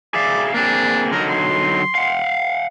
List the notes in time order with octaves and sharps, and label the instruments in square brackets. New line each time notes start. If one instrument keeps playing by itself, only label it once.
[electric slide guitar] G#4 E5 F5 [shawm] D5
[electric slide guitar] A#3 C4 G#4 [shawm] D4
[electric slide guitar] D3 F#3 D#4 [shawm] A#4
[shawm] C6
[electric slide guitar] F5 F#5